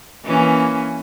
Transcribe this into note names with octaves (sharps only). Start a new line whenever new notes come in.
E3 A#3 C#4